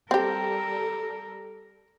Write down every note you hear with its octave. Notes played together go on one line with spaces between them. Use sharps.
G3 C4 G4 A4 A#4